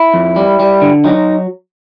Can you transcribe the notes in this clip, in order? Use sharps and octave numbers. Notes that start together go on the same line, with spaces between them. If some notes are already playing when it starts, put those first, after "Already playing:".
Already playing: E4
F2
G3
G3
D3
F#3 D#4